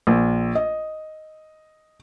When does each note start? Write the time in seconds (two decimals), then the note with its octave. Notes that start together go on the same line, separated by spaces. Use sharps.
0.07 A#1
0.55 D#5